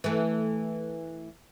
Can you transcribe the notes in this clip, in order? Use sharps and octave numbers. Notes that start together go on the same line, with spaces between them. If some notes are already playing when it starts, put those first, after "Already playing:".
E3 A3